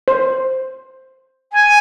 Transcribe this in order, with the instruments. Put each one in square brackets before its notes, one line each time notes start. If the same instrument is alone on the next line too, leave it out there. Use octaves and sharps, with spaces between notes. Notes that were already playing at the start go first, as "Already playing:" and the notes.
[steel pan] C5
[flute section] G#5